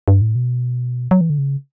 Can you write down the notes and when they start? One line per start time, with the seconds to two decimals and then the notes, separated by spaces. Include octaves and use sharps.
0.08 G2
0.21 A2
0.35 B2
1.11 F#3
1.21 E3
1.30 D3
1.38 C#3